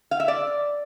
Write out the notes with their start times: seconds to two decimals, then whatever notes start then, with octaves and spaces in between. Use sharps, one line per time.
0.11 F5
0.20 E5
0.28 D5